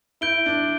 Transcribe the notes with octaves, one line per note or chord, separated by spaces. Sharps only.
E4 G6 D7 G7
D4